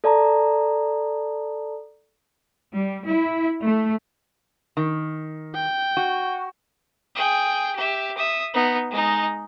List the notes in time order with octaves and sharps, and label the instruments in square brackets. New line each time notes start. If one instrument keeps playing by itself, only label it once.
[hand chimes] A4 D5 A5 A#5
[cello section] G3
E4
A3
[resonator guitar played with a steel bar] D#3
[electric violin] G5
[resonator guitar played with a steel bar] F#4
[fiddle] G#4 G5
G4 E5
E5 D#6
B3 D#4
G#3 D#4